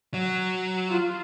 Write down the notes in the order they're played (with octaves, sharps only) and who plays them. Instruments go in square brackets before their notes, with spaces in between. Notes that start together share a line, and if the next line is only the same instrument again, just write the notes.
[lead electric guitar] F#3
[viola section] F4